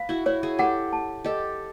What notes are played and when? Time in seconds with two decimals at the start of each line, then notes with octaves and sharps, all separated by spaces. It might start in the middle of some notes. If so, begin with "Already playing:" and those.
Already playing: B4 F5
0.09 E4 F#4
0.26 E4 F#4 C#5
0.43 F#4 G#4
0.59 G4 A4 F#5
0.93 A5
1.24 G4 A4 D#5